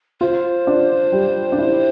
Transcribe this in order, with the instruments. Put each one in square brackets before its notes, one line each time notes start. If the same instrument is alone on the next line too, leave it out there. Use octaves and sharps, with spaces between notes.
[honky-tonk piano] F4 [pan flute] C5
[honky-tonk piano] D4
G3
D4
E4